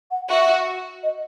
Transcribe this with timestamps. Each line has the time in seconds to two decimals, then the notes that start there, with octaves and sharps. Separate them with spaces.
0.11 F#5
0.29 F#4 E5
1.03 D#5